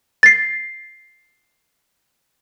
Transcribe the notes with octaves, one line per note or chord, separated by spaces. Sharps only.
A6 C7